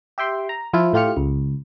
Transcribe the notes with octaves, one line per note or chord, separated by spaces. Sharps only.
G4 E5 G5 C6
A#5
F3 E4 F4
A2 A3 F4 G4 F6 C#7
C#2